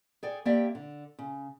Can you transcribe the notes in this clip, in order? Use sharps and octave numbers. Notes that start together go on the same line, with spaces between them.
G#4 A4 D5 G5
A#3 C4 G4 D5 E5 G5
D3
C#3